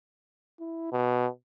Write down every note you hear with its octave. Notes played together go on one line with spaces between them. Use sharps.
E4
B2